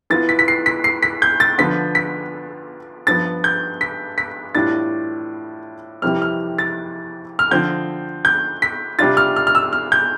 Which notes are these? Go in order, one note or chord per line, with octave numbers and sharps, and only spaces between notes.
E3 B3 F4 A6
B6
B6
C7
B6
C7
B6
G6
A6
D3 F3 B3 F4 B6
B6
G2 F3 B3 A6
G6
B6
B6
A2 E3 G3 D4 F4 A6
F2 C3 E3 G3 C4 F6
F6
A6
F6
D3 F3 C4 F4 G6
G6
B6
C3 G3 D4 F4 A6
F6
F6
F6
E6
F6
G6